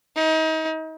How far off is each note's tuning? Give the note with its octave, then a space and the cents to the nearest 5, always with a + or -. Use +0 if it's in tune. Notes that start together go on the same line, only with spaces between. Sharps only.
D#4 +35